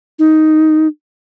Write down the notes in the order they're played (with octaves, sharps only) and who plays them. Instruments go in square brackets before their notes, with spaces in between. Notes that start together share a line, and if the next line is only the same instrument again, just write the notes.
[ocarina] D#4